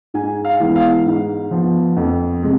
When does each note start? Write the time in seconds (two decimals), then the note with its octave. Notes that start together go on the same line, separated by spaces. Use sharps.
0.14 G#2 G#5
0.45 F5
0.60 E3 G#3 B3
0.76 F5
1.06 G#2
1.51 F3 B3
1.97 F2
2.43 C3 G#3